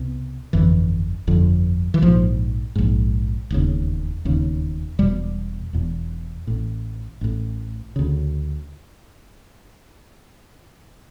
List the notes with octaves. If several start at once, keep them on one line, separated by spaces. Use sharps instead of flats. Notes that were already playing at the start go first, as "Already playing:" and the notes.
Already playing: C2 B2
G1 F2 D3 E3
G1 F2 D3
E3
A#1 G#2 F3
A#1 G#2
E1 D#2 C#3
E1 D#2 C#3
E1 E2 B2 G3
E1 E2 B2
A1 A2
A1 A2
D2 C#3